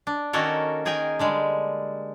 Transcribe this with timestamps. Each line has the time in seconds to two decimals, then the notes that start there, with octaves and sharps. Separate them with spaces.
0.07 D4
0.33 D#3 A#3 C#4 F#4 A4 A#4
0.85 D#3 G#4 A#4 G5 G#5
1.19 D3 G3 G#3